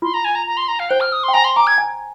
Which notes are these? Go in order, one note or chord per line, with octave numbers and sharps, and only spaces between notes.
F4 C6
A#5
G#5
A#5
A#5
C6
A#5
F5
C5 G5
F6
D#6
G5 C6
G#5 A#5
C6
A#5 D6
G#6
G#5